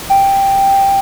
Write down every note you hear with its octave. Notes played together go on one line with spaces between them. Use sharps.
G5